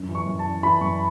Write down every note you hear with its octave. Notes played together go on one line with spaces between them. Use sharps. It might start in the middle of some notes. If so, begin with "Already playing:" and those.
Already playing: F#2
E3
C#6
F#2
A5
E3
E3 B5
F#2 C#6